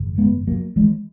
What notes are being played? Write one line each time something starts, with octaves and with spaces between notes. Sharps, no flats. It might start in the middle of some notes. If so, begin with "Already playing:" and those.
Already playing: G#1 F#2 C#3
G#3 B3
F#3 A#3
E3 G#3